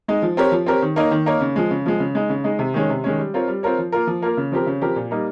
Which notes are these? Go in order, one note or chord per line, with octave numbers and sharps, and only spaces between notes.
G#3 D#4
F3
C4 G4 A#4 C#5
F3
C4 G4 A#4 C#5
D#3
A#3 D#4 A#4 C#5
D#3
A#3 D#4 A#4 C#5
C#3
F3 G#3
C#3
F3 G#3
C#3
G#3 D#4
C#3
G#3 D#4
C3
D#3 G#3 C#4
C3
D#3 G#3 C#4
G3
C4 F4 A#4 C#5
G3
C4 F4 A#4 C#5
F3
A#3 F4 A#4
F3
A#3 F4 A#4
C#3
F3 C4 G4 A#4
C#3
F3 C4 G4 A#4
A#2
G3 A#3 D#4